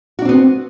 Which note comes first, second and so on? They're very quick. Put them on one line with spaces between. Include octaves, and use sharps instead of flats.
F#4 D4 C4 B3